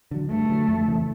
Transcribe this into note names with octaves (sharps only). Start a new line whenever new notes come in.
D3 F#3
G2 A3
D3 F#3
F2
C#3 E3 A3